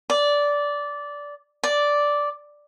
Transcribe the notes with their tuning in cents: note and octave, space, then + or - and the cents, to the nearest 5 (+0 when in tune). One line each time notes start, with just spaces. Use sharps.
D5 -15
D5 -5